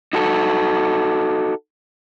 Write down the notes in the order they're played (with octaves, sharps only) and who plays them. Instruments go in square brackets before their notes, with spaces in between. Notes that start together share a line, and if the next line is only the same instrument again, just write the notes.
[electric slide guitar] D#4 F#4 A4